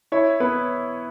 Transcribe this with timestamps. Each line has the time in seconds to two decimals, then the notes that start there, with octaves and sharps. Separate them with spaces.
0.12 E4 C#5
0.40 B3 B4